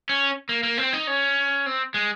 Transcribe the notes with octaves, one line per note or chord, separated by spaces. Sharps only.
C#4
A#3
A#3
C4
D#4
C#4
C4
G#3